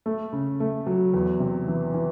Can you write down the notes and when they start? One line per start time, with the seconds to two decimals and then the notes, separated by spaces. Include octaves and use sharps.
0.06 A3
0.33 C#3
0.60 A3
0.87 F#3
1.14 E2
1.40 C3
1.68 E3
1.94 E3